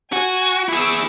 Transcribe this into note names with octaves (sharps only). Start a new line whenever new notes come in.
F#4 G#5
E4 G#4 C#6 D6 E6